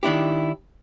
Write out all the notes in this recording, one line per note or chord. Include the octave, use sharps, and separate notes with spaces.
D#3 D4 E4 G4